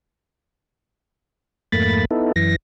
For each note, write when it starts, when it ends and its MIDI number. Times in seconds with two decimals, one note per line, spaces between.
1.72 2.05 41
1.72 2.05 44
1.72 2.05 57
1.72 2.05 58
1.72 2.05 83
1.72 2.05 93
2.11 2.32 59
2.11 2.32 63
2.11 2.32 64
2.11 2.32 69
2.36 2.56 42
2.36 2.56 52
2.36 2.56 94